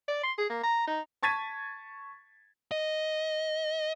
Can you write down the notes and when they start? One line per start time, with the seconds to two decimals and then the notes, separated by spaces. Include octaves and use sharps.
0.08 D5
0.23 C6
0.38 G#4
0.50 A#3
0.63 A#5
0.88 D#4
1.23 A5 C#6 G#6 A6 B6 D#7
2.71 D#5